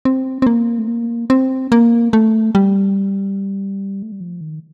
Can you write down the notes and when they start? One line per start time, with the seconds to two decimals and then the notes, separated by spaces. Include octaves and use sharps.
0.05 C4
0.42 C4
0.47 A#3
0.78 A3
0.88 A#3
1.30 C4
1.72 A#3
2.13 A3
2.55 G3
4.03 A3
4.12 G3
4.20 F3
4.41 D#3